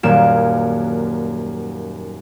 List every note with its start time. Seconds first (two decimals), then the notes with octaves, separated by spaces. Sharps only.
0.03 D#1 F#2 A#3 D7 E7